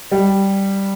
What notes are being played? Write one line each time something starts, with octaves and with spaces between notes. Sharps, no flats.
G3